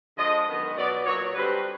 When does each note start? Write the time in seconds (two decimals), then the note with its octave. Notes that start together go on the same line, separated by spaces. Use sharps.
0.17 D3 F3 G#3 D#5
0.47 F#2 D#3 G#3 B3
0.76 B2 F#3 B3 D5
1.05 A#2 F#3 B3 C#5
1.35 D3 G3 C4 B4